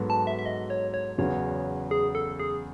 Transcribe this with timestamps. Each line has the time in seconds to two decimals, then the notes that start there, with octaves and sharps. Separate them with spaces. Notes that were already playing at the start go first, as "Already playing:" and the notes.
Already playing: G#2 F#3 B3 F#4 A4
0.10 A5
0.27 E5
0.39 E5
0.46 D#5
0.70 C#5
0.94 C#5
1.18 E2 C#3 F#3 B3 C#5
1.91 G#4
2.15 A4
2.39 G#4